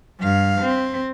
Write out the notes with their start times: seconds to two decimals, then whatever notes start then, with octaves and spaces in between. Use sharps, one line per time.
0.19 G2 F5
0.62 C4